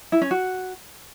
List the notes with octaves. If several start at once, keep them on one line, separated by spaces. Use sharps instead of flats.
E4
C#4
F#4